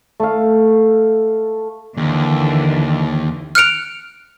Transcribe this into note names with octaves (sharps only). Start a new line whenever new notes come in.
A3 F5
D#2 D3 E3
F6 F#6 C#7 D7 F7